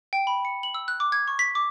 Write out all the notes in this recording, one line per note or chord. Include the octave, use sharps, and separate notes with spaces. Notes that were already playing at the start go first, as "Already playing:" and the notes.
G5
B5
C#7
F#7
E6
F#6
D6
G#6
C#6
B6
D6